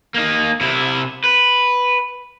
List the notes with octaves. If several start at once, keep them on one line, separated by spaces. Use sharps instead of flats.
A#3 D#4
C3 E4
B4